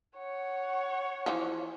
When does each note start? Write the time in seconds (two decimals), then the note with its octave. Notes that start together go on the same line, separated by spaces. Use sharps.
0.18 C#5 F#5
1.26 E3 F3